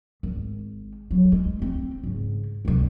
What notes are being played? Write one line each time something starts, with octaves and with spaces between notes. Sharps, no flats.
G#1
F#3
G#3
C4
G#2 C#3
C2 G2